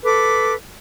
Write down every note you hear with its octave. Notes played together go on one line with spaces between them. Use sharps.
A4 B4 D6